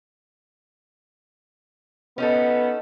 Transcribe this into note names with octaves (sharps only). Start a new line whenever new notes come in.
B3 C#4 D#4 A4